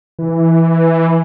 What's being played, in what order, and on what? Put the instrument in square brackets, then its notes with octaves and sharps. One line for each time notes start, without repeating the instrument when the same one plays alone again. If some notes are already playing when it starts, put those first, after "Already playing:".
[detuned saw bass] E3